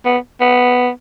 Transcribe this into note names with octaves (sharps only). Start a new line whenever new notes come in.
B3
B3